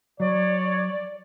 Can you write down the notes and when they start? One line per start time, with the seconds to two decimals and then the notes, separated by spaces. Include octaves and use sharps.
0.20 F#3 C#5 D5